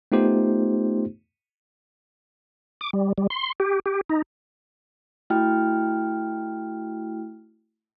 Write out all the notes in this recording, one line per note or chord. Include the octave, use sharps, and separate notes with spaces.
A3 B3 D#4 F4 G4 C5
D6
G3
G3
C6
G4
G4
D#4
A3 E4 F#4 G5 F6